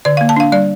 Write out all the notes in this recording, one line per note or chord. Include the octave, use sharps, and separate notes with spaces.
D3 D5
A#3 F5
A5
D4 F5
G3 D5